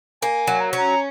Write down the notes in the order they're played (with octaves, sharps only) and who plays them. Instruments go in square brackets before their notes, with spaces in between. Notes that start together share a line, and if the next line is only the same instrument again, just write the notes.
[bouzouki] A#3 [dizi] G#5
[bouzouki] F#3
[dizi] A#5
[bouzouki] C#4 [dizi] A#5